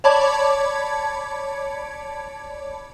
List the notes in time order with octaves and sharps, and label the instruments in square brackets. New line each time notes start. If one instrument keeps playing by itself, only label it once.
[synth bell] C#5 D5 A5 B5 D6 G#6